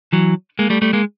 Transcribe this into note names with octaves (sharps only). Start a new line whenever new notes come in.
E3 F#3
G#3 A#3
G3 A3
G3 A3
G#3 A#3